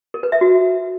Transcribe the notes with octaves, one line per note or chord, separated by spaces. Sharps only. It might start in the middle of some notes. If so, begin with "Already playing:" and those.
A#4
B4
E5
F#4